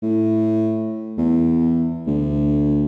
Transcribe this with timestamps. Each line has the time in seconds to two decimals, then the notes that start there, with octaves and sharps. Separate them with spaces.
0.03 A2
1.18 E2
2.08 D2